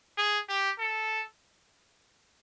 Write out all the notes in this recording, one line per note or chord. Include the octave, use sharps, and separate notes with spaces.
G#4
G4
A4